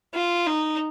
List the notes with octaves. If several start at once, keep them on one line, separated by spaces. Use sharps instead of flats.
F4
D#4